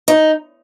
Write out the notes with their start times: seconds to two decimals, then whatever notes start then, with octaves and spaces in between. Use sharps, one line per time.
0.08 D#4